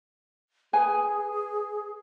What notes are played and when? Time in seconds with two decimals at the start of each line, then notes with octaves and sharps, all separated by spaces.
0.73 G#4 B4 G#5